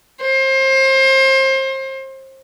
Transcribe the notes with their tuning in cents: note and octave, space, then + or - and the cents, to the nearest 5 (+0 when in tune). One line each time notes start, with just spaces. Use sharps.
C5 +30